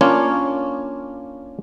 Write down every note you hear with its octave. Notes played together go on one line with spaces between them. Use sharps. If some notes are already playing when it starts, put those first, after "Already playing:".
A#3 C#4 D4 F4 C#5